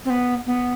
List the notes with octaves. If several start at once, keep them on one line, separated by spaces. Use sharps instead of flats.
C4
B3
B3